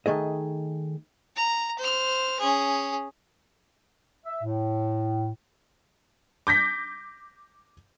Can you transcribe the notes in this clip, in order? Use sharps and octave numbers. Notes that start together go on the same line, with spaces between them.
D#3 A3 G#4 D#5
A#5
C5 F6
C#4 G#4
E5
A2
D6 G6 A#6 B6